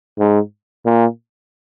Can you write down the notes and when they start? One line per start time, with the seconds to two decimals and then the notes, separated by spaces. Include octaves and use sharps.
0.19 G#2
0.85 A#2